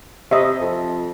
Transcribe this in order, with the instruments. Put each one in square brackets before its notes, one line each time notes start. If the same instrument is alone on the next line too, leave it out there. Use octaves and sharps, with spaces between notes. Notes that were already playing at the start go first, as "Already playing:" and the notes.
[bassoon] C3 [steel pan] D#5 E5
[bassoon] F2